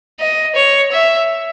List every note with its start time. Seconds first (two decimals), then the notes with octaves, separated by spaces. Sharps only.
0.20 D#5
0.56 C#5
0.92 E5